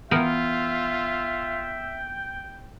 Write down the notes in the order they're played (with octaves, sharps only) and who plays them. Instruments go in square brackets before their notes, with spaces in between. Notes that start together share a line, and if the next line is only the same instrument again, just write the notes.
[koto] E3 B3 A#4 [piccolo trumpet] F4 [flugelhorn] E5 [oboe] G5